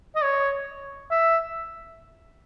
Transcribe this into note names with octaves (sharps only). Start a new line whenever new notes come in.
D#5
C#5
E5